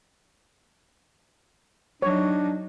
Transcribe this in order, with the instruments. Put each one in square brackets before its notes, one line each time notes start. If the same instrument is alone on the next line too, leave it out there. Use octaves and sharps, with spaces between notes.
[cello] F#3 D#4 [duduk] D4 [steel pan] C#5